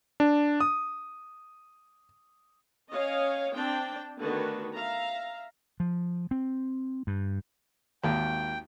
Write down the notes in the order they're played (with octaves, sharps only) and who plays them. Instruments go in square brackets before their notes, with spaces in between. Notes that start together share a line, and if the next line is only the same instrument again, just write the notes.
[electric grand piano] D4
D#6
[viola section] C#4 C#5 D#5 F5
C4 D4 G5
D3 D#3 A3 B3 F#4 B4
E5 F5 A#5
[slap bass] F3
C4
G2
[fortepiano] G#1 D#2 [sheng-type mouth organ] G5